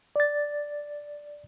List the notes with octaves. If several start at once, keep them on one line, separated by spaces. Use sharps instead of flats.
D5 A6